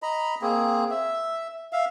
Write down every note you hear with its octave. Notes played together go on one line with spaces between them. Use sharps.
D#5 A#5 B5
A#3 C4 G#4
E5
E5 F5